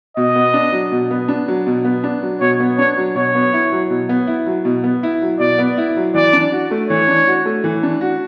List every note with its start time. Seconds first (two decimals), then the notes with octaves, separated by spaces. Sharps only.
0.17 B2 D#5
0.35 B3
0.54 D4
0.72 F#3
0.92 B2
1.11 B3
1.28 D4
1.48 F#3
1.66 B2
1.85 B3
2.04 D4
2.23 F#3
2.41 B2 C#5
2.60 B3
2.78 D4 C#5
2.98 F#3
3.15 B2 C#5
3.35 B3
3.53 E4
3.72 F#3
3.90 B2
4.09 B3
4.27 E4
4.47 F#3
4.65 B2
4.84 B3
5.03 E4
5.22 F#3
5.39 B2 D5
5.58 B3
5.78 E4
5.97 F#3
6.14 E3 D5
6.33 D4
6.52 F#4
6.71 A3
6.89 E3 C#5
7.08 D4
7.27 F#4
7.46 A3
7.64 E3
7.83 D4
8.01 F#4